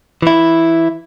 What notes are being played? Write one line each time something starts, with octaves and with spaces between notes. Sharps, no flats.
E3 E4